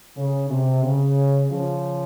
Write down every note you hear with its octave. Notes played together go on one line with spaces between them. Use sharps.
C#3
C3
C#3
C#3 F3